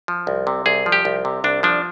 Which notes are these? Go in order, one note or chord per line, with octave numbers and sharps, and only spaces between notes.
F3
C2
C3
C2 G#4
F3
G4
C2
C3
C2 D4
F3 D4